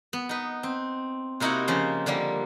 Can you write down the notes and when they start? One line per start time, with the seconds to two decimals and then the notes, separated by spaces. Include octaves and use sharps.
0.13 B3
0.29 D#4 B4
0.63 C4
1.40 C3 A#3 D#4 E4 F#4 F#5
1.68 C#3 F3 C5
2.06 D3 F3 G3 A#3